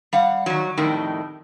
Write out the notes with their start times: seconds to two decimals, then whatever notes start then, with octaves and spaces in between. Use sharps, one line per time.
0.13 G3 F5 F#5
0.46 D#3 F#3
0.77 F2 A2 D#3 G3